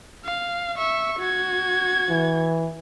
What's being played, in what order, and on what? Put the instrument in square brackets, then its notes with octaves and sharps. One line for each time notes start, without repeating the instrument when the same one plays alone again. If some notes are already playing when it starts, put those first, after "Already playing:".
[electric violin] F5
E5 C#6
F#4 G#6
[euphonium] E3